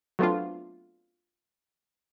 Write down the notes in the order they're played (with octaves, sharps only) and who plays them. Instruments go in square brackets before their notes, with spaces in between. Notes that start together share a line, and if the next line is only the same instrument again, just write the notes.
[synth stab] F#3 A3 B3 C4 D4 F4